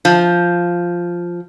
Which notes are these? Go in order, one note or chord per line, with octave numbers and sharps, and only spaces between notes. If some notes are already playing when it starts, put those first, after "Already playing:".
F3